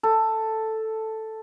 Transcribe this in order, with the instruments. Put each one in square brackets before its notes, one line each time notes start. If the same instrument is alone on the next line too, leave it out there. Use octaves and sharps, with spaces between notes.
[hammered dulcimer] A4